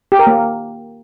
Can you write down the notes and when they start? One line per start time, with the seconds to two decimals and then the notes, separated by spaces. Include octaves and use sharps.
0.12 G4
0.19 A#4
0.27 A#3